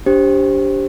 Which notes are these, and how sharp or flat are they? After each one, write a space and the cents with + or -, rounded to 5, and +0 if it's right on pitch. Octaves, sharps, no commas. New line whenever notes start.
D4 -30 G4 +0 C5 +10